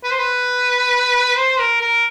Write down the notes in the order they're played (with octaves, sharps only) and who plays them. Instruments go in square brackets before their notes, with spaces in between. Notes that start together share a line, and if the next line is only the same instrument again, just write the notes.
[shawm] B4
C5
B4
C5
A#4
A#4